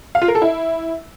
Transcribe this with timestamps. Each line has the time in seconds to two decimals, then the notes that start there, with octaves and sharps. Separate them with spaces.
0.15 F5
0.22 F4
0.28 A#4
0.35 A4
0.42 E4